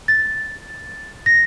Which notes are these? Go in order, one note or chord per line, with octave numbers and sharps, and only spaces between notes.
A6
A#6